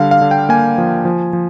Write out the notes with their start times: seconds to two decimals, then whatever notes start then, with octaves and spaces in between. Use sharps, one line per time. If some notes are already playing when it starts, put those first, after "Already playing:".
Already playing: D3 G3 F5
0.11 F5
0.21 D3
0.31 G5
0.49 A#3 G#5
0.78 F3
1.05 F3
1.33 F3